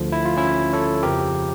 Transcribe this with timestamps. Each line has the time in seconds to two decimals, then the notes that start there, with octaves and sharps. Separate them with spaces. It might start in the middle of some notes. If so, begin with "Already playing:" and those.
Already playing: D2 D3 F3
0.12 E4
0.25 F4
0.37 C#4 E4
0.73 A4 C#5
1.03 F2 C#3 F3 G4 A#4